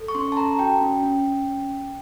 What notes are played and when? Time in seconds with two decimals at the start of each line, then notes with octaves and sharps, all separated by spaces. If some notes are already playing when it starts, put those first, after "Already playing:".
Already playing: A4
0.08 C#6
0.15 C#4 C6
0.32 A5
0.37 A4 A#5
0.59 F#4 G5
0.81 C#4
1.03 C#4
1.25 C#4